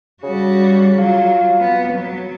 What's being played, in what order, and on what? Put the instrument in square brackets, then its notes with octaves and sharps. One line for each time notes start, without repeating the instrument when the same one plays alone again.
[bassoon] C#3 [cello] G3 F#4
[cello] F#3 [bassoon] F4
[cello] B3
F#3